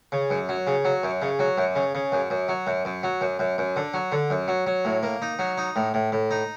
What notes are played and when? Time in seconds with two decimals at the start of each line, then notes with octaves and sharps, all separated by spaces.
0.12 C#3
0.30 F#2
0.49 F#3
0.67 C#3
0.85 F#3
1.03 F#2
1.22 C#3
1.39 F#3
1.58 F#2
1.76 C#3
1.95 C#3
2.12 F#2
2.30 F#2
2.48 F#3
2.67 F#2
2.85 F#2
3.03 F#3
3.21 F#2
3.39 F#2
3.58 F#2
3.76 D3
3.94 F#3
4.12 D3
4.30 F#2
4.48 F#3
4.67 F#3
4.85 A2
5.03 A#3
5.22 D#4
5.39 F#3
5.58 D#4
5.76 A2
5.94 A2
6.12 A2
6.31 D#4